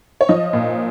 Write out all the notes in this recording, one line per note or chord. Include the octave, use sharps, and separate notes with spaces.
C#5
F3 D#5
A#2